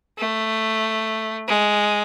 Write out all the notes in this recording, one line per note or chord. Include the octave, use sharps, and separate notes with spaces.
A3
G#3